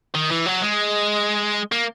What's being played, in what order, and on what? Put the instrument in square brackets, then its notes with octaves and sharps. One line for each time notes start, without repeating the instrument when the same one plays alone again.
[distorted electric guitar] D#3
E3
F#3
G#3
A#3